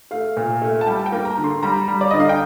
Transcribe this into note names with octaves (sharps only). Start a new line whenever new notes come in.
A3 F5
A#2
A3
A5
G3 G5
A5
G5
A#3
A#5
D3
C6
G3 A#5
G3
D5
D3 D#5
F5
G5